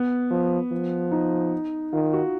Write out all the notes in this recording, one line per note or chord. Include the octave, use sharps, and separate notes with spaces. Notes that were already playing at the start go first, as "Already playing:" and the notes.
Already playing: B3
F3
F3
D#4
D#3 F4
F#4